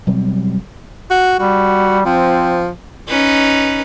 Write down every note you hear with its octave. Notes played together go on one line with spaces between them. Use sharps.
B2 F#3 G3 C4
F#4
G3 F#4
F3 C4
C#4 D#4 B4